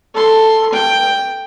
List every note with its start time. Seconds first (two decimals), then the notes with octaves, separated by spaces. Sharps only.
0.15 A4 C6
0.73 G5